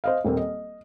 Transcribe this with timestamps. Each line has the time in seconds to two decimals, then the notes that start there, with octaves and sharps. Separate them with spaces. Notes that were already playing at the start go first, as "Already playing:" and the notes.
0.04 C5 D#5 F5
0.25 D#1 A#3 C4
0.37 D#5